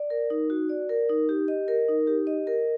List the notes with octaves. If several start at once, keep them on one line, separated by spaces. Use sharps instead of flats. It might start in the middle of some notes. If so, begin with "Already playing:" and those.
Already playing: D5
A#4
D#4
F#4
D5
A#4
D#4
G4
D#5
A#4
D#4
G4
D#5
A#4